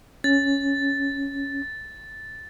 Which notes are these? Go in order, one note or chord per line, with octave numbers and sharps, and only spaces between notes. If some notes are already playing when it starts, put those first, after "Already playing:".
C#4 A6